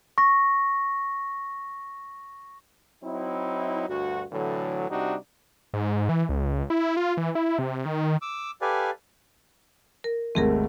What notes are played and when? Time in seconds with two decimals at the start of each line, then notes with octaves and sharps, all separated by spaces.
0.18 C#6 A#6
3.04 F#3 C4 D#4 E4
3.89 D2 G2 F#4
4.32 A2 D3 E3 F#3
4.89 C3 G3 D4 D#4 F#4
5.74 G#2
6.09 E3
6.29 C#2
6.70 E4
6.97 F4
7.17 E3
7.35 E4
7.59 C3
7.85 D#3
8.21 D6 E6
8.61 G4 A4 B4 D5 F5 G#5
10.04 A#4
10.35 G#1 D#2 A3 C4 G#4 A#4